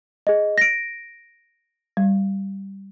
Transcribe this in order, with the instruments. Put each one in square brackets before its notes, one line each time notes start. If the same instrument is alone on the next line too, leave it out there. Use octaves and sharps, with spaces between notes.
[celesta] G#4 D#5
A#6 D7
[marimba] G3